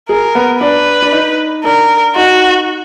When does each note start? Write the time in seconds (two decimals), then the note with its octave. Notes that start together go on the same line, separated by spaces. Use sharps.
0.09 G#4 A#4
0.35 B3
0.61 D4 B4
1.02 D4
1.12 D#4
1.64 D4 A#4
2.15 D#4 F#4